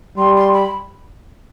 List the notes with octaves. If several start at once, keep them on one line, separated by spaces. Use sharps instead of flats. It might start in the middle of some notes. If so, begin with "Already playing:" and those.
G3 C6
C6
B5